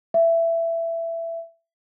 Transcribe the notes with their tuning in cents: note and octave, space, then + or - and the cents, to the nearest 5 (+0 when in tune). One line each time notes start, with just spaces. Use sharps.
E5 +15